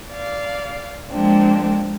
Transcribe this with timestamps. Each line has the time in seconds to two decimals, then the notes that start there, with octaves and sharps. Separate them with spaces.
0.10 D5 F5
1.10 F3 G#3 A#3 C4 D4